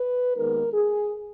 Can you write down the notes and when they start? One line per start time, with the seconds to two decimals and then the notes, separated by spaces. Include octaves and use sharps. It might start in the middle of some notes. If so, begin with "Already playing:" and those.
Already playing: B4
0.36 D#2 D#3 G#3 B3 D#4 A#4
0.73 G#4